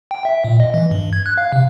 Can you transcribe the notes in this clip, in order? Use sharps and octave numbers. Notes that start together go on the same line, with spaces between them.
G5
E5
A#2
D#5
E3
G2
G#6
F#6
F5
C3